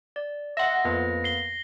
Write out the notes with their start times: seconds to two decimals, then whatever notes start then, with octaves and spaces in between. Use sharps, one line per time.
0.16 D5
0.57 D#5 E5 F#5 C6 E6 A#6
0.85 F2 A#3 B3 B4
1.24 C7 G7